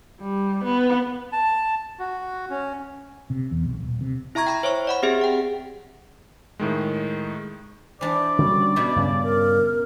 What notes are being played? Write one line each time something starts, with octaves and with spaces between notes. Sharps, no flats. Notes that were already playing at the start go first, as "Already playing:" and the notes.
G3
B3
A5
F#4
C#4
C3
E2
B1
D#1
C3
E4 E5 A#5 C#6 G#6 A#6
G5 B5 C#6
C5 C#5 E5 C#6
D5 F#5 B5
C4 G4 G#4 E5
F#5 G5
A2 D#3 G#3
E3 D4 C5 D5
D3 G3 C#4 F#4
B2 E4
G2 C#3 F5
A#4